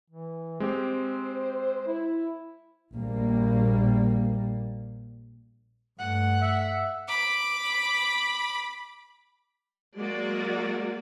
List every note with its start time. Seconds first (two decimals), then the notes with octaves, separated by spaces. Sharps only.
0.10 E3
0.60 G#3 C4 G4 C5
1.87 E4
2.96 A#1 G3 A#3
5.99 G2 A3 F#5
6.42 E5
7.08 B5 D6
9.97 F#3 G#3 A#3 F#4 D5